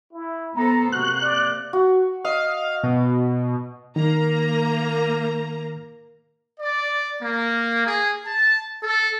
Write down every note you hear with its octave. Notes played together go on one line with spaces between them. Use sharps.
E4
B3 A4 C5 A#5
C3 A#3 F#4 F#6
D5
F#4
D#5 F5
B2
D#3 A#3 A#5
D5
A#3
G#4
A5
A4